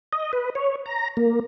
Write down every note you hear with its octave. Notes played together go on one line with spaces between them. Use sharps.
D#5
B4
C#5
A#5
A#3